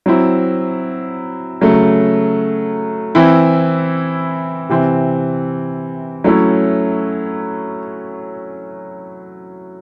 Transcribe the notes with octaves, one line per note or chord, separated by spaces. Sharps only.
F#3 C4 E4
C#3 F#3 A3
E3 C4 E4
C3 E3 C4
F#3 A3 C#4 E4